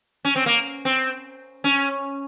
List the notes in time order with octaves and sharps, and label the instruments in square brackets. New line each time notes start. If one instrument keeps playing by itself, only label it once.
[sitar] C#4
C4
A#3
C4
C#4